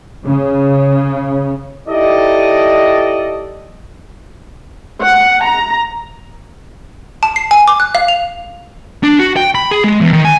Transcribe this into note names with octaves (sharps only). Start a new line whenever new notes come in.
C#3
D#4 E4 G4 A4 D5 D#5
F#5
A#5
A5
C7
G#5
D6
F#6
F5
F7
D4
F#4
G5
B5
G#4
G#3
E2
D#3
G#5